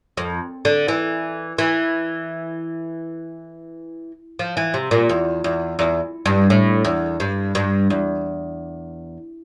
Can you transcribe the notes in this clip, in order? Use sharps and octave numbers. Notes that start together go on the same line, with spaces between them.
F2
D3
E3
E3
F3
E3
C3
A#2
E2
E2
E2
G2
A2
E2
G2
G2
E2